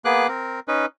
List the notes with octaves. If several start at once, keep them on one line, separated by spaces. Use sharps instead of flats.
A#3 B3 G#4 B4 D6 F#6
C4 A#4
C#4 D#4 B4